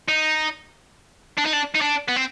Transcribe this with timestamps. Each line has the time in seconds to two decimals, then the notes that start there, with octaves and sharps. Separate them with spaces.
0.09 D#4
1.38 D4
1.46 D#4
1.53 D4
1.75 D#4
1.82 D4
2.09 B3
2.16 C4